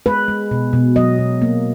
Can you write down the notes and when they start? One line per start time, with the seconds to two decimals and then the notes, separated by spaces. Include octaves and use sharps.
0.06 G#3 B4
0.28 G#3
0.51 B2
0.73 B2
0.96 F#3 D#5
1.19 B2
1.42 A#3